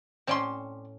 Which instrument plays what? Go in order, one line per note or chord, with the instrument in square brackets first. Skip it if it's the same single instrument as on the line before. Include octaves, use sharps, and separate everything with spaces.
[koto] A2 C#4 A5 [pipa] C4 D5 C6